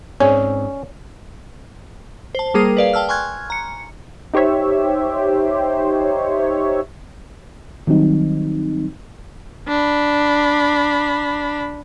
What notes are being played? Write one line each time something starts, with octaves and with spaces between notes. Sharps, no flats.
G#2 C4 C#4 G#4 C#5 D5
C5 A5
G3 A#3 G#4 A#4 D#6 C7
B4 D5 F5
G5 A5 E6 F6
G#5 C6 C#6 F6 F#6 G#6
A#5 C#7
D#4 G4 C5 C#5 E5
D#3 F#3 G3 C4 D#4
D4 B5